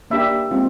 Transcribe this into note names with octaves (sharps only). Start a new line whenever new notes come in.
A#3 D4 G4 E5
G#3 C4 F4